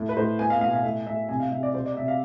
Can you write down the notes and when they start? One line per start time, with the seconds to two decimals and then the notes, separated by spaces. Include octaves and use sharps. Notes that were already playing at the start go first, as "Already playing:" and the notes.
Already playing: A2
0.09 B4
0.16 A2 C5
0.39 B3 G#5
0.50 F5
0.61 B2 F5
0.73 F5
0.83 A2 E5
1.06 A2 E5
1.29 C3 G#5
1.40 F5
1.51 C3 E5
1.63 D5
1.74 C3 C5
1.86 D5
1.96 C3 E5
2.08 F5